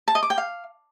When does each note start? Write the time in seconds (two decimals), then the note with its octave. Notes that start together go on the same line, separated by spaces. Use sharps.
0.08 A5
0.15 D#5
0.23 D6
0.30 G5
0.38 F5